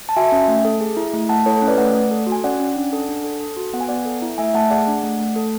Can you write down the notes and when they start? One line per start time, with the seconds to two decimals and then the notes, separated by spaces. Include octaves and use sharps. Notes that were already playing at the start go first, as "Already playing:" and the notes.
0.09 A5
0.17 F#4 E5 G#5
0.32 C#4
0.48 A3
0.65 A4
0.81 G#4
0.97 E4
1.13 A3
1.29 A3 F#5 A5
1.46 E4 A4 C#5
1.56 A4 C#5
1.62 C#4
1.68 B4 D5
1.78 A3 D5 F#5
1.94 A3
2.11 A4
2.27 F#4
2.32 G#5
2.44 C#4 D5 F#5
2.60 C#4
2.76 D4
2.93 A4
3.09 D4
3.24 A4
3.40 A4
3.57 F#4
3.73 B3 F#5
3.81 G#5
3.88 B3 D5 F#5
4.05 A4
4.22 E4
4.38 A3 E5 G#5
4.54 A3 F#5 A5
4.70 G#4 D5 F#5
4.87 D4
5.04 A3
5.20 A3
5.36 A4